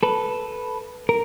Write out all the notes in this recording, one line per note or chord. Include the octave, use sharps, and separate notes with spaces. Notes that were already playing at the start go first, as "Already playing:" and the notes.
A4 B4
A#4